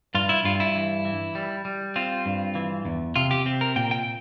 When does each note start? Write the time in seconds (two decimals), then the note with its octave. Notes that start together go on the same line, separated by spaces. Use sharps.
0.15 G2 F4
0.29 E4
0.45 G2 F4
0.60 E4
0.75 E3
1.05 E3
1.35 G3
1.65 G3
1.96 C4 F4
2.26 G2
2.55 E3
2.85 E2
3.16 C3 F4
3.31 G4
3.46 C4
3.61 A#4
3.76 A#2 G5
3.91 G5